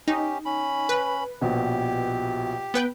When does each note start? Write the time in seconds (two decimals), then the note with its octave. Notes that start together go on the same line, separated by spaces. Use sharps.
0.08 C#4 D#4 G4
0.45 C#4 B5
0.89 B4
1.41 A#1 B2 G4
2.74 B3 B4 G5